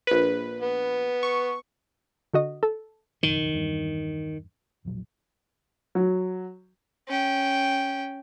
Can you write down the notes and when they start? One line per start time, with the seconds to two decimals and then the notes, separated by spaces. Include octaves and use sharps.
0.07 A#1 B4
0.60 B3
1.23 C#6
2.34 D3 F#4 D#5
2.63 A4
3.23 F#1 B1 F2 D#3
3.53 E2 G2
4.85 E1 A#1 F#3
5.95 F#3
7.08 C#4 G5